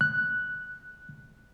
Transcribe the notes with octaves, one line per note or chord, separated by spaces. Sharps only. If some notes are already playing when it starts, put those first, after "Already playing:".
F#6